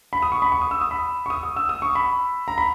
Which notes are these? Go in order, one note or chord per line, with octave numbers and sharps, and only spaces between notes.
B5
D#6
C#6
B5
C#6
D#6
E6
D#6
B5
C#6
D#6
D#6
E6
D#6
C#6
B5
A#5
B5